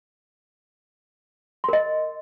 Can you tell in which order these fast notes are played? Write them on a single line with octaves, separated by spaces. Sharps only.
C6 A#4 D#5